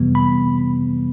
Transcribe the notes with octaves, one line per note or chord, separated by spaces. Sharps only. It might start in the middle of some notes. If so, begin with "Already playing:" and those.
Already playing: F2 C3 E3 G3 B3
B5